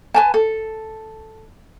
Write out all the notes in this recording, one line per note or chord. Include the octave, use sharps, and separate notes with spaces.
B4 G#5 A5
A4